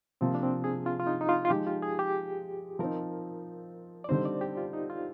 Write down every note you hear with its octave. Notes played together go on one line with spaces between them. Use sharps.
C3 F3 A#3 C4
D4
C4
G#4
F4
F4
D#4
D#4
F4
F4
F3 G#3 D#4 G4
F4
G#4
G4
F3 C4 D#4 A#4
D5
D3 G3 C4 D#4 C5
D5
G4
F4
D#4
F4